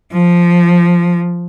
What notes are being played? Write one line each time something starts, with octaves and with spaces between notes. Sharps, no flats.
F3